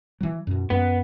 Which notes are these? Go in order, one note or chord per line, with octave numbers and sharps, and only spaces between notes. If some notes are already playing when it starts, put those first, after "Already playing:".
E3 F#3
F#2 B2
F#2 B3